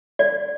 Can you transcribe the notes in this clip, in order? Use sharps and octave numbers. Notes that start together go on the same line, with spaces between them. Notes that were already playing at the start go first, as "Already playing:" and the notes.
D5